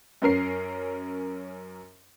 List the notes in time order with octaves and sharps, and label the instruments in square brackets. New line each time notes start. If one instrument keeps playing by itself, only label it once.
[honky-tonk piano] F#2 C#4 A#4 C7